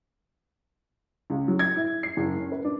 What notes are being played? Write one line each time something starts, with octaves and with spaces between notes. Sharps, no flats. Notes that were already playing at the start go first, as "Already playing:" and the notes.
C#2
F#3
G#6
E4
C7
F#1
C#4
B4
D4